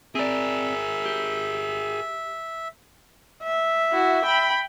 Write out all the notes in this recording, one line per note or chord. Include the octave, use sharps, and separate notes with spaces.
C4 G#4 A#4 D5 E5
G4
E5
E4 F#4
G5 B5